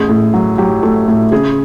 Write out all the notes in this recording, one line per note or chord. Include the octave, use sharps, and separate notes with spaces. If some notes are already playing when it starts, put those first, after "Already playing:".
Already playing: A1 G#4
A2
F#3
F#3 G4
A3
A2
C#3 G#4